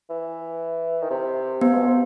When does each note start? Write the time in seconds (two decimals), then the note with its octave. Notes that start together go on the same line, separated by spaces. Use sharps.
0.10 E3
1.03 D#3
1.10 C3
1.61 C3 B3
1.74 B2
1.87 C3